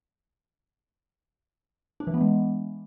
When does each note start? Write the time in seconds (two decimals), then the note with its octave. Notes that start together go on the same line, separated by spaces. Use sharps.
2.00 D4
2.07 E3
2.14 B3
2.21 G#3